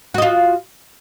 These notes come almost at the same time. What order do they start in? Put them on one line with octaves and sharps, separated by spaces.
F#4 D#5 F4